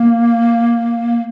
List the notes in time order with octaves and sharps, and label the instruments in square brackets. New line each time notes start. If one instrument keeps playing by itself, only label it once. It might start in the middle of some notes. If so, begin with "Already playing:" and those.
Already playing: [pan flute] A#3